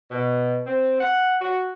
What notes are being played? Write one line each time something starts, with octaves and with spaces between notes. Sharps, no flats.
B2
C4
F#5
F#4